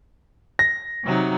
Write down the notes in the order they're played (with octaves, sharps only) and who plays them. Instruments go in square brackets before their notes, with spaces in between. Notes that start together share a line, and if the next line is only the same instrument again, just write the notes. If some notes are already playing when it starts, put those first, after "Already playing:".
[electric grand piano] A#6
[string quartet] C3 F#3 D#4